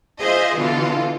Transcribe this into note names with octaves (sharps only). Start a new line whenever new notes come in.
F4 G#4 C5 D#5 E5
B2 D3 E3 F4 A4